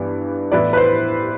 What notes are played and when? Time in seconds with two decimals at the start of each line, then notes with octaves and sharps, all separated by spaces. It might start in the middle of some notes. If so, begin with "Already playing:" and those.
Already playing: G2 E3 B3
0.52 A2 E3 B3 E4 B4 D5
0.73 B4
0.77 C5